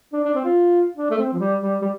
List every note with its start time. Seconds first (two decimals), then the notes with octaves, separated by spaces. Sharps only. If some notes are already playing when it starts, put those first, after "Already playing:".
0.13 D4
0.24 D4
0.35 C4
0.44 F4
0.97 D4
1.10 A3
1.18 C4
1.33 F3
1.39 G3
1.60 G3
1.82 G3